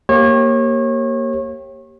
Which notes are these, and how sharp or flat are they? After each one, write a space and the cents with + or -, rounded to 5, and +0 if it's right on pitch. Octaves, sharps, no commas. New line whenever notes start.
A#3 +0 G4 +0 C#5 -30